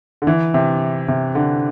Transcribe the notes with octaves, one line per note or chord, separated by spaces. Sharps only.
D3
E3
C3
C3
D3